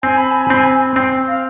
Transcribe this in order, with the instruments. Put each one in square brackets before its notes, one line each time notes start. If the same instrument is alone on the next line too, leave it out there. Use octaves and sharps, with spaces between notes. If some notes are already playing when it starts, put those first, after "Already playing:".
[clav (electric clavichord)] C4 [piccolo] G#5
[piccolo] B5
G#5
B5
[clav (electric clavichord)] C4
[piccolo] G#5
[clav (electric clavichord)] C4 [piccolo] G5
[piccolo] F5